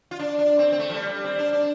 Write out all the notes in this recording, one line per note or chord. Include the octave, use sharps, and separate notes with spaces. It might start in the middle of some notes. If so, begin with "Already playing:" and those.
F4
D4
D4
C4
C4
A3
F3
G3
G3
C4
D4
D4